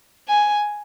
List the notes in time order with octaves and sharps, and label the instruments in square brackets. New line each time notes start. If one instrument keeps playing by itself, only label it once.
[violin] G#5